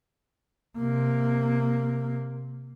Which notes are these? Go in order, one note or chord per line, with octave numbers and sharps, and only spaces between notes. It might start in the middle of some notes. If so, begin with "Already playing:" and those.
C3 A#3